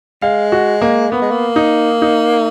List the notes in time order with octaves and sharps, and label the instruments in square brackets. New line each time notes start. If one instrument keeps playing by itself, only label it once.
[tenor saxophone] G#3 [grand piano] F5
[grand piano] F#4
A#3
[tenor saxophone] A#3 [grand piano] B3
[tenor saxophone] G#3
A#3
[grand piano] D#4
D#4